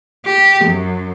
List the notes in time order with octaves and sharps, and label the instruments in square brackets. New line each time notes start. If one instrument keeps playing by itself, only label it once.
[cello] G4
F#2